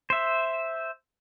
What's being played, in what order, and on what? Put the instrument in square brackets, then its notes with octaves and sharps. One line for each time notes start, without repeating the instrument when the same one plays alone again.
[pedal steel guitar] C5 E5